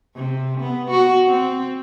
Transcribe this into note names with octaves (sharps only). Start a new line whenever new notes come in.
C3
B3
F#4
C4